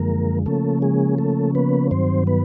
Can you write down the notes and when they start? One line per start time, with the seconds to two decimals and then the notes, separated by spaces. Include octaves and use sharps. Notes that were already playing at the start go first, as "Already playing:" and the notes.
Already playing: F#2 D3 F3 G#3 A#3 A#4
0.46 C#3 F3 A3 A#3 C#4 A4
0.82 G#3 G#4
1.18 A3 A4
1.55 B3 B4
1.91 G2 D#3 F#3 C4 C5
2.27 B3 B4